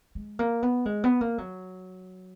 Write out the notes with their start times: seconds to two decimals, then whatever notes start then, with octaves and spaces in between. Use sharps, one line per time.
0.15 G#3
0.39 A#3
0.63 B3
0.86 G#3
1.04 B3
1.21 A#3
1.38 F#3